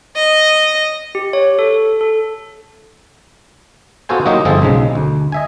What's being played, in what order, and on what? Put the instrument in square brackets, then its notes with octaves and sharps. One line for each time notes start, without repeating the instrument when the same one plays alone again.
[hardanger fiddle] D#5
[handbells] G4
C#5
A4
A4
[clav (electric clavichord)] B3 F4 F#4 A4 C5 G#5
F#3 A#3 D#4 F4 G4 D#5
G1 F3 C4 G#4 A4
B1 C#3 G#3
D2
D#5 E5 G#5